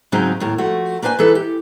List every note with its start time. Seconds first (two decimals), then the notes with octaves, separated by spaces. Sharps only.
0.12 G#2 C#3 F#3 C4 D#4
0.40 D#2 A2 A#4
0.58 F3 A3 F#4
1.02 A#3 D4 B4 C5 G#5
1.19 E3 D#4 A4 B4
1.35 G4